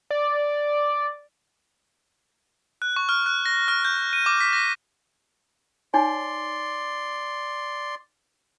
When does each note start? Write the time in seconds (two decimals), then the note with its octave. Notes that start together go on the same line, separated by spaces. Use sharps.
0.11 D5
2.82 F#6
2.96 C#6
3.09 F6
3.26 F#6
3.46 A#6
3.68 F6
3.85 G6
4.13 D#7
4.26 D6
4.41 B6
4.53 A#6
5.94 D#4 C#5 D5 G#5 C6